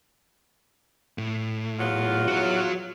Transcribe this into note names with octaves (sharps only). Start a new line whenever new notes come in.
A2
E2 F#3 F4
F#4 C#5